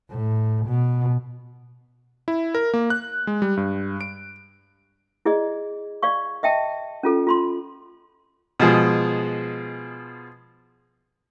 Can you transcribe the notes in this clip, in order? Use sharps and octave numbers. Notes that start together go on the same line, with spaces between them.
A2
B2
E4
A#4
A#3
F#6
G#3
G3
G2
D7
E4 G#4 D5 D#5
D5 F5 C#6
D#5 E5 G5 A5
C#4 F4 A4
F4 B5 C6
B2 F3 G#3 G#4